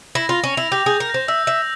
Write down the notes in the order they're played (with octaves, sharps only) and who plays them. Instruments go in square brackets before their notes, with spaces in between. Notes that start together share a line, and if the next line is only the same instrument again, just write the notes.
[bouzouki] E4 [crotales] A#6
[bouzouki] F4
[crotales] A#6
[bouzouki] C#4
[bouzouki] E4 [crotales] F7
[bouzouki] G4 [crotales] G6
[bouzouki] G#4 [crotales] G6
[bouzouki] A#4
[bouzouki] C5 [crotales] A#6
[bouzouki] E5 [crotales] E6
[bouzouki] E5 [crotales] E6